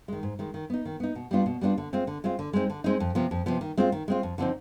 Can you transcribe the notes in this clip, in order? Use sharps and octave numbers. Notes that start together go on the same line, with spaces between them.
D#3 G#3
G#2
D#3 G#3
D#3
B3 D#4
D#3
B3 D#4
B2
G3 B3 D4 F4
B2
G3 B3 D4 F4
D3
G#3 C4 F4
D3
G#3 C4 F4
D3
G#3 C4 D#4
D3
G#3 C4 D#4
F2
C3 F3 B3
F2
C3 F3 B3
D#3
G#3 C4 F4
D#3
G#3 C4 F4
F2
D3 F3 C4 D#4